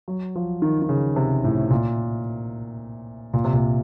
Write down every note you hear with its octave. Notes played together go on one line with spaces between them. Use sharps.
F#3
F3
D#3
D#3
C#3
C3
A2
A#2
A#2
C3
A#2